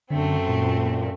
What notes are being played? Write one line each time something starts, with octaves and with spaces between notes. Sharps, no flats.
F#2 D3 A3 C4
A#2